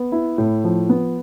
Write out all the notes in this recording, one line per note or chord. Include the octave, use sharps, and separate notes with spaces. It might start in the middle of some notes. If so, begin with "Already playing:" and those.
Already playing: B3
E4
A2
F3
B3